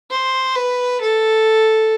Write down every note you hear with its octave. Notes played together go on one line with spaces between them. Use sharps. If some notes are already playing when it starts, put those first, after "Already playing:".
C5
B4
A4